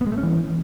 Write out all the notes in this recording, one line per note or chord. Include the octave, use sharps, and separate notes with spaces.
B3
G#3
A3
C#4
E3